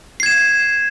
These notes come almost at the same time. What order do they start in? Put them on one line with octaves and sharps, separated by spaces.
C7 G#6 E7